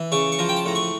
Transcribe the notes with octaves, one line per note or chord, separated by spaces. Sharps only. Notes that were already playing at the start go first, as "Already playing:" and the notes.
Already playing: E3
C#3 C#6
C#6
F3 A#5
G5
A5
A2 A#5
C#6